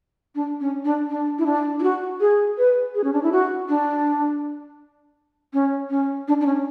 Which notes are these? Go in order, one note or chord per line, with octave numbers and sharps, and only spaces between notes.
D4
C#4
D4
D4
E4
D4
E4
F#4
G#4
B4
G#4
C#4
D4
E4
F#4
D4
C#4
C#4
D4
D4
C#4